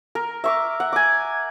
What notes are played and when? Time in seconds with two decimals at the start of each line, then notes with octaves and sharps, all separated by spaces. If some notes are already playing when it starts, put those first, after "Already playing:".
0.15 A#4
0.44 E5 C#6 D6
0.80 F#5
0.93 G#5 D6